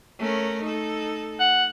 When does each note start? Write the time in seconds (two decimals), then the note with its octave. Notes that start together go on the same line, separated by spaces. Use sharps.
0.19 A3 C#4 A#4
0.62 D#4 A4
1.40 F#5